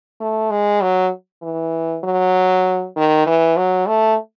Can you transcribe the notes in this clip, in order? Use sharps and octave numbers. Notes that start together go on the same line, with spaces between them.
A3
G#3
F#3
E3
F#3
D#3
E3
F#3
A3